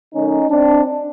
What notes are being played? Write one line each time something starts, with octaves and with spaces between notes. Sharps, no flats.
D#3 F#3 A3 C#4 D#4
C4 D4